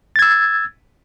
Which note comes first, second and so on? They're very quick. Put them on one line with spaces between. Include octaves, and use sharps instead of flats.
A6 G#6 E6